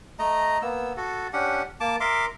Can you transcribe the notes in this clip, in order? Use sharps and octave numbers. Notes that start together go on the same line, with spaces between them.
A3 D#5 A#5
A#3 B3 E6
F#4 A4
C#4 D4 G4 F#5
A#3 A5 D6
A#4 E5 C6 D6